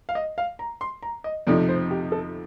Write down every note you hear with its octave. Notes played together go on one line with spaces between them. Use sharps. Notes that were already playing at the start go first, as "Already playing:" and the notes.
F5
D#5
F5
A#5
C6
A#5
D#5
F2 C3 F3 A3 D#4 D5
C5
G4
A4